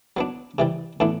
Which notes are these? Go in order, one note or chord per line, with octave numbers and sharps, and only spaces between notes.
F#3 B3 D4
C3 E3 G3
A2 E3 B3 D4